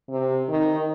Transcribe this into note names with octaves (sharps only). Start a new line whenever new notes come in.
C3
D#3